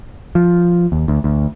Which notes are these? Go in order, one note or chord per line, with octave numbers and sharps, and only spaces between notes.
F3
D#2
D2
D2